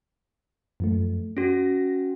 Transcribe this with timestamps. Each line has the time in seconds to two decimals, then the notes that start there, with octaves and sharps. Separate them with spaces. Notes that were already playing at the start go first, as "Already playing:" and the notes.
0.80 F#2 F3 A3
1.37 C#4 F#4 A#6